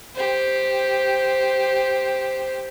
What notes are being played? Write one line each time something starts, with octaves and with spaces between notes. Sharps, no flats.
G4 C5